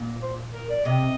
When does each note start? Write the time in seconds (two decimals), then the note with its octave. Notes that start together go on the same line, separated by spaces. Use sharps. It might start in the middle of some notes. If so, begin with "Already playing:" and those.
Already playing: A#2
0.22 C5
0.53 A#4
0.69 D5
0.85 C3 D#5